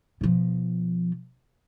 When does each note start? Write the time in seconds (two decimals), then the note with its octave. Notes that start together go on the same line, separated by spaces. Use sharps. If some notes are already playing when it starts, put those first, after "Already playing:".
0.21 B2 F3